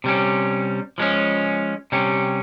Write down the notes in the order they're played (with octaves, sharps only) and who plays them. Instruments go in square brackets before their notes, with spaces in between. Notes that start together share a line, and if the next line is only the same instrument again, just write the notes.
[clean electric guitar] C3 G3 C#4
F3 G#3 C#4
C3 G3 C#4